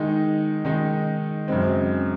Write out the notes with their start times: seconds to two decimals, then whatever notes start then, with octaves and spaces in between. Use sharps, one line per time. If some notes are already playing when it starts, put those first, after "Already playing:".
Already playing: D#3 G#3 D#4
0.65 D#3 G#3 D#4
1.48 F#2 C#3 G#3 C4